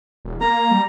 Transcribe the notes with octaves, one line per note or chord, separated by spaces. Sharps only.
E1
A#3 A#5
G3